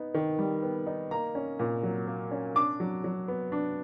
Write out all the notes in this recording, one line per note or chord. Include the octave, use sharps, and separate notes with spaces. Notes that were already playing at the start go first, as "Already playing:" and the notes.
Already playing: B3 D#4
D#3
G3
B3
D#4
A#3 A#5
C#4
A#2
F#3
A#3
C#4
D4 D6
F#3
F#3
B3
D4